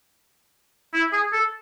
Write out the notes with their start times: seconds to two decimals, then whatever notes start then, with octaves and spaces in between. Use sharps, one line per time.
0.93 E4
1.13 G#4
1.33 A4